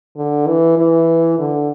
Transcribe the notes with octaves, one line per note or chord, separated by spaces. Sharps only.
D3
E3
E3
D3